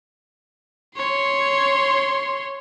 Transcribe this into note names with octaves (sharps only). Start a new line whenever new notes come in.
C#5 C6